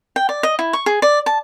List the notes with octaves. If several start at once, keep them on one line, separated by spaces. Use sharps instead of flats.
G5
D5
D#5
E4
C#6
G#4
D5
A5